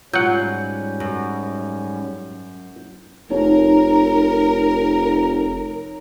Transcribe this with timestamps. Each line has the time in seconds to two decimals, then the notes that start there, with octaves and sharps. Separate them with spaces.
0.14 G#2 F#3 G3 C#4 F4 F#5 G6
1.00 F#2
3.30 F1 D#4 A#4 C#5